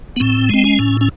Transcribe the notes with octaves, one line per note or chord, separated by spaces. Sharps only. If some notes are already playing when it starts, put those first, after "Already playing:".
B3
A2 C4
G#3 C4
C#4
A2
C#4